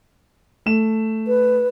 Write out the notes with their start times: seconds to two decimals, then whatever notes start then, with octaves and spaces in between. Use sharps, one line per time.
0.66 A3 E7
1.27 B4